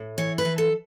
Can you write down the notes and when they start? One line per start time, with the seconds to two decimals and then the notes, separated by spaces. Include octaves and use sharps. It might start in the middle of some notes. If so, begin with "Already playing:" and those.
Already playing: A2
0.18 E3 C#5
0.38 B4
0.45 E3
0.58 A4